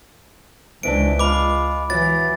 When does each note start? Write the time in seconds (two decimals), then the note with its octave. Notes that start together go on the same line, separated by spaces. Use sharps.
0.83 C#2 C3 E3 D4 D7
1.19 G#3 F4 B5 D6
1.90 E3 F#3 A6